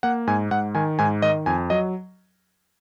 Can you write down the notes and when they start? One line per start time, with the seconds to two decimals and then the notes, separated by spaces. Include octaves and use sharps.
0.03 A#3 F#5
0.27 G#2 G#5
0.51 G#2 F#5
0.75 D#3 G#5
0.99 G#2 G#5
1.22 D#3 D#5
1.46 F2 G#5
1.70 F#3 D#5